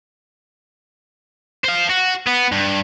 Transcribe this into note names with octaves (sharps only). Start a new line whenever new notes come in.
C5 F5
F#4
B3
G2